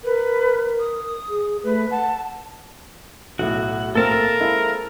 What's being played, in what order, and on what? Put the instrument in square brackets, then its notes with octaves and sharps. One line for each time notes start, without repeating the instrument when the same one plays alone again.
[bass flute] A#4 [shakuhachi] B4
[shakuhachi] D#6
[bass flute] G#4
[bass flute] A3 [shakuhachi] B4
[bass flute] F#5 [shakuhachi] A5
[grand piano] B1 A2 [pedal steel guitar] F#4
[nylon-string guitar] A#3 C4 [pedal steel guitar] A4 A5 [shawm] A#4
[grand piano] G#3 E4 F5